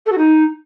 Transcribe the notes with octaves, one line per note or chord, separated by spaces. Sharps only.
A4
F#4
D#4